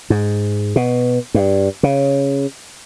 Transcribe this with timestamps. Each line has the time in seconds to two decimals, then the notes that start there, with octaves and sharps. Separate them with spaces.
0.10 G#2
0.76 B2
1.34 G2
1.83 C#3